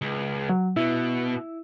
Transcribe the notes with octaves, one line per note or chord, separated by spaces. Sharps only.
C#2
F#3
B2 E4